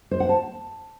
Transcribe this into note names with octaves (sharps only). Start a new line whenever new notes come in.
C5
F#5
A5